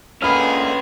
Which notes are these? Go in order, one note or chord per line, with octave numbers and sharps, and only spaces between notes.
D3 G#3 A#3 C#4 G#4 B4 B5 F6